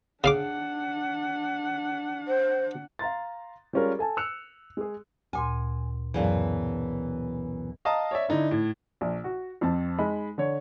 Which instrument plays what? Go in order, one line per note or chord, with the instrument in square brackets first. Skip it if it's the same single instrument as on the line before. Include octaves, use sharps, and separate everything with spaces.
[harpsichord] C#3 F5 D6 [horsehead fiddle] D4 F#5
[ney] C5
[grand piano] F5 A#5 C6 A6
G3 G#3 C#4 F4 A#4
A4 G#5 A5
E6 F#6 C#7 F7
G#3 G#4
[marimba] D2 A#2 C6 [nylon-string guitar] G#5
[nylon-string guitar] F#2 B2 E3 [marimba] G#4 D5 F5
[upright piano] D#5 F5 A5 A#5 D#6
C#5 D5 E5
D3 D#4 E4
A2
A#1
F#4
F2 C4 A5
G#3 D#4 B5
D3 C#5